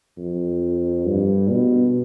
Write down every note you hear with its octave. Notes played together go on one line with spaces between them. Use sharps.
F2
G2
B2